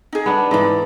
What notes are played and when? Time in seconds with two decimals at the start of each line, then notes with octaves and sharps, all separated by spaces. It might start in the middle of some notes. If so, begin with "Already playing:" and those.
0.13 D#4 G#4
0.26 B3 D4
0.51 G#2 E3 D#4 D5